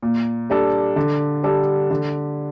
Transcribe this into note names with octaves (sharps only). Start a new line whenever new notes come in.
A#2
G3 D4 A4
D3
G3 D4 A4
D3